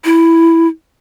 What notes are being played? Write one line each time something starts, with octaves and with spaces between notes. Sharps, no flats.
E4